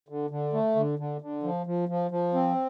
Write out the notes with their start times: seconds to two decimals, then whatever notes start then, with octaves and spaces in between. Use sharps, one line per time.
0.09 D3
0.30 D3
0.53 A3
0.76 D3
0.99 D3
1.21 D3
1.43 F3
1.66 F3
1.89 F3
2.11 F3
2.34 C4